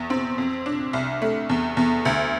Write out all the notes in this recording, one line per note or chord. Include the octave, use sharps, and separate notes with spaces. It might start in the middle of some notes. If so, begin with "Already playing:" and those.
Already playing: E2
C4
F2
D4
C2
A3
E2
E2
D2